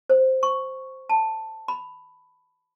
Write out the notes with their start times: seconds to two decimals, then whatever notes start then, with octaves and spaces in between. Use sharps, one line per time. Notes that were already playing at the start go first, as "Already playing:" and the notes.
0.10 C5
0.43 C#6
1.09 A5
1.68 B5